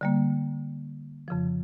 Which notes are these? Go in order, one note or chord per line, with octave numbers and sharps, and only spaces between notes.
D3 G3 A#3
F2 C#3 F3